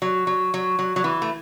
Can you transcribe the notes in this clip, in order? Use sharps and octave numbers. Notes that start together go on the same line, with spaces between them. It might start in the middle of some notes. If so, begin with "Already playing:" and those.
F#3
F#3
F#3
F#3
F#3
E3
A3